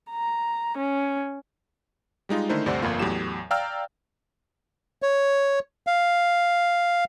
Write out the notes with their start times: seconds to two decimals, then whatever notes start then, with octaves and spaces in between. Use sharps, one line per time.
0.11 A#5
0.78 C#4
2.29 G3 G#3 D#4 F4
2.49 D3 D#3 A3 D#4 E4 C5
2.66 D2 G2 C3 C5 D5 F#5
2.82 G1 F2 A#3 F4
2.99 E2 A2 F#3 G4 E7
3.51 D5 F5 G5 A#5 E6 F6
5.02 C#5
5.87 F5